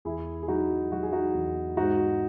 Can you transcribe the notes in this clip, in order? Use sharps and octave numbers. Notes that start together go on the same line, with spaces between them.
E2 E4 G#4
G#4
F#3 D#4 F#4
F#3 F#4
G#4
D#4 F#4
E2
G#2 D#4 F#4